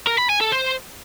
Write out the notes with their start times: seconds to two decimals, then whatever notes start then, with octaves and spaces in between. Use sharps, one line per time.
0.07 A#4
0.18 B5
0.30 G#5
0.41 A4
0.52 C5